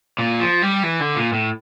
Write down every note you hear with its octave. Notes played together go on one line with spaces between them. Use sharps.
A#2
F3
G3
E3
D3
A#2
A2